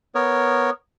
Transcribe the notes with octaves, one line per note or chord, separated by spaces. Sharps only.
B3 A#4 C#5